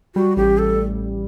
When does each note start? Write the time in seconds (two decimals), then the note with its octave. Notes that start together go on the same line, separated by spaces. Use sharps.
0.15 G3 F#4
0.37 A1 G4
0.58 A4